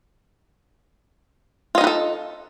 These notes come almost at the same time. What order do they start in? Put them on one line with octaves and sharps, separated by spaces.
F4 D#5 D#4 B4 A4